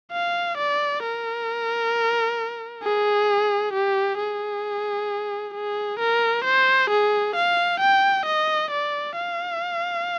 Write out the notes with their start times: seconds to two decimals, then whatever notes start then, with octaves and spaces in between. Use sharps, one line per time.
0.12 F5
0.58 D5
1.03 A#4
2.83 G#4
3.74 G4
4.19 G#4
5.55 G#4
6.00 A#4
6.45 C5
6.90 G#4
7.36 F5
7.80 G5
8.26 D#5
8.71 D5
9.17 F5